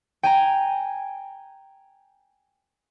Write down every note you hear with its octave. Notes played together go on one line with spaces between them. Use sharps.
G5 G#5 A#5